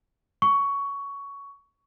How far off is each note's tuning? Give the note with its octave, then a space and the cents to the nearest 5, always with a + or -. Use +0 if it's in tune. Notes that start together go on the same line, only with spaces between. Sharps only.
C#6 +15